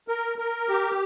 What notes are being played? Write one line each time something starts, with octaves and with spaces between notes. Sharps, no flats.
A#4
A#4
G4